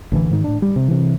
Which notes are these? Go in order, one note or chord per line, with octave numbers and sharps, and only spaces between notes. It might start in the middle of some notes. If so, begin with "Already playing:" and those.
A1 D3 E3
G#2 D#3
A2 D4
G3
C3
C3 E3